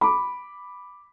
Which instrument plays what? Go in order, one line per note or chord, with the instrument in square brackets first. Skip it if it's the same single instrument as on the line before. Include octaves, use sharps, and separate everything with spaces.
[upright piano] B5 D6